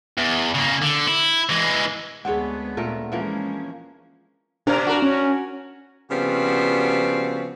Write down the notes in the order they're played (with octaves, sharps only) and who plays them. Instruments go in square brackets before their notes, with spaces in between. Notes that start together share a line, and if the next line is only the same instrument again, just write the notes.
[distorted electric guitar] E2
C#3 A#3
D3
E4
E3 G#3
[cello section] D2 G#3 B3 [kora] C4 D4 C#5 [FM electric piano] G#4 F#5
[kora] A#2 A3 A#4
[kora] E3 F3 A#3 [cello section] G#3 C#4
[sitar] B2 A#4 [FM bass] D4
[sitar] F#4 A#4
[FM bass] C#4
[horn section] C#3 F3 G3 B3 C4 F#4